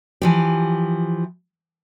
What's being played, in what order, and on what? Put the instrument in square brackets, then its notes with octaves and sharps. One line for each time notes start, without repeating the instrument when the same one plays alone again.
[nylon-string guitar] E3 F3 G4